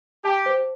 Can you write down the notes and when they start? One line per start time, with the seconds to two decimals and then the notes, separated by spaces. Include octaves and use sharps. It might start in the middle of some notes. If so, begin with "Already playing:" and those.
0.25 G4 A5
0.46 C5